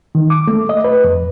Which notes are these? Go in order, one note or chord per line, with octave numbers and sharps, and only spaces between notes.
D#3
D6
A3
D#5
B4
F2